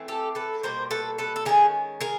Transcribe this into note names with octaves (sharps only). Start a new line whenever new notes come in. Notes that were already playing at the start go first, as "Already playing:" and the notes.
Already playing: E3 A3 C4
G4 A4
A4 B4
B2 G3 A#3 A#4 C5
A4 B4
A4 B4
A4
D#3 G#3 C#4 G#4 A#4
G#4 A#4